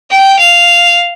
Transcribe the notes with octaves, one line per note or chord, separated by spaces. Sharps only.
G5
F5